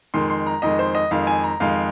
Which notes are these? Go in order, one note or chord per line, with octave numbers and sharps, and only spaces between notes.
F2 D#3 G#3 C6
C6
A#5
F2 D#3 G#3 D#5
C5
D#5
F2 D#3 G#3 F5
G#5
A#5
F2 D#3 G#3 F5